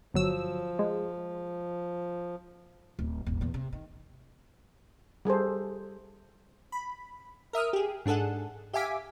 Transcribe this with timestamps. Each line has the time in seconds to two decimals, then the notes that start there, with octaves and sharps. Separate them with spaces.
0.14 G1 F3 F#3 E6
0.79 G#3
2.99 D1
3.26 D#1 G#1
3.41 E2 A#2
3.54 C3
3.73 D#3
5.25 G3 G#4 A4 C5
6.72 B5
7.53 A#4 E5 D#6 F6
7.73 G4 G#4
8.06 G#2 D4 G#4 A4 F#5
8.73 G4 E5 F5 G#5 D6 B6